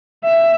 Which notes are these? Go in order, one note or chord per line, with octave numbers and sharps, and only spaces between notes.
E5